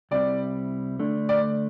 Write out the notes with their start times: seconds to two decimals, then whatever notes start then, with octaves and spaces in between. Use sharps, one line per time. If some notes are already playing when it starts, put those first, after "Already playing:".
0.11 C2 C3 G3 C4 E4 D5
0.99 D3 A3 D4
1.29 D5